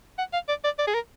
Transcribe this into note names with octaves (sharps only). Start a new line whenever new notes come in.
F#5
F5
D5
D5
D5
G#4
A#4